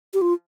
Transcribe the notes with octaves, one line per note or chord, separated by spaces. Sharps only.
G4
F4